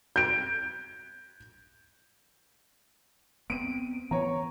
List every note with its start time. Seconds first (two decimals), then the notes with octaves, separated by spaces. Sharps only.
0.16 G6 D7
3.50 B3 C4 D7 D#7
4.11 E3 B3 C#5 A#5